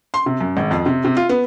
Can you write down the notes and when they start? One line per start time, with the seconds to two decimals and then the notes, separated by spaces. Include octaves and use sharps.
0.14 C6
0.26 C3
0.41 F#2
0.57 G#1
0.71 F2
0.86 C3
1.05 C3
1.17 F4
1.29 B3